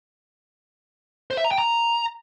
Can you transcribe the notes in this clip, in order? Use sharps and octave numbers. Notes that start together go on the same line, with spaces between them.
C5
E5
A#5
G5
A#5